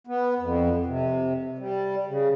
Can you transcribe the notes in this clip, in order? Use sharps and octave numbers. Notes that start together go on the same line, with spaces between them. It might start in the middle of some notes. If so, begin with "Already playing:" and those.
B3
F2
C3
G3
C#3